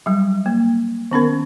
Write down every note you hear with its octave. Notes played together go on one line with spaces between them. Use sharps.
F#3 G3
A#3
D#3 B3 C#4 A#4